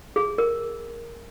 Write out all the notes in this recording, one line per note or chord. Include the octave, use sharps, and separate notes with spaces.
G#4
A#4